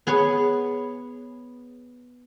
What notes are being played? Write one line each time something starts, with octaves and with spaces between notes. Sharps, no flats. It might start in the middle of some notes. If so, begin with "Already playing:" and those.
B3 G#4 B4 C#5